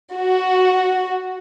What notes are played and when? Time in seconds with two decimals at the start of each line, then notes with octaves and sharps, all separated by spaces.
0.14 F#4